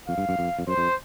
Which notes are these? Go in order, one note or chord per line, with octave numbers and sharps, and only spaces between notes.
F2 F5
G2
F#2
F2
F2
F#2 C5
F2